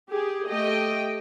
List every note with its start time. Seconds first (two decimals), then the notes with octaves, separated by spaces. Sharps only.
0.10 G4 G#4
0.50 A3 G4 D#5 G5